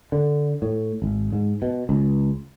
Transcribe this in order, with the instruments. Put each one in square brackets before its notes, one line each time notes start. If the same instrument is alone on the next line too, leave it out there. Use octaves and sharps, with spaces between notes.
[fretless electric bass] D3
A2
G#1
G#2
B2
C#2